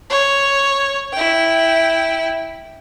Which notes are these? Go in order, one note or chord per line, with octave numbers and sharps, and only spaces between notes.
C#5
E4 G5